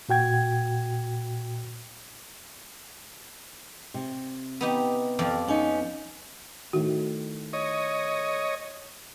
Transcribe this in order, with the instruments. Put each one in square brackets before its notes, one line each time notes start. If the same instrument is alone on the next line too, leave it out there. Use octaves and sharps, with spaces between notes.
[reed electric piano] A#2 F#4 G5 G#6
[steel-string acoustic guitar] C3
[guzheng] B3 D#4 G4
F2 F3 D5
[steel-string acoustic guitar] B3 C#4 D#4
[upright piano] A2 D#3 [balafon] F#4
[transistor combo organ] C#5 D#5